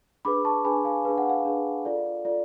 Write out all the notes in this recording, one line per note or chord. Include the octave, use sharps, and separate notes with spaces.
D4 G#4 B4 B5 D6
A5 C#6
D4 G#4 B4 G#5 B5
F5 G#5
D4 G#4 B4 F5
F#5
F5
D4 G#4 B4
F4 A4 D5
F4 A4 D5